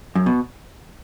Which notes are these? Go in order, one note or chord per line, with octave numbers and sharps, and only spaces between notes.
F#2
B2